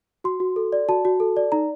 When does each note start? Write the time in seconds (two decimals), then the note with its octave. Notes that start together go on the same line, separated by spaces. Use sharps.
0.24 F#4 C6
0.40 F#4
0.56 A4
0.72 D5
0.89 F#4 A5
1.05 F#4
1.20 A4
1.37 D5
1.52 D#4 A#5